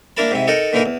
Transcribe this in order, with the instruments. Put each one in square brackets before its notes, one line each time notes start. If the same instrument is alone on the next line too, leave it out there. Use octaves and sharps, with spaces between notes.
[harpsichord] A#3 D4 E4 A#4 A5 B5
G#2 C3 E4
D#4 A4 A#4 D#5 F#5
A#2 D3 E3 D#4 E4 A#4
E2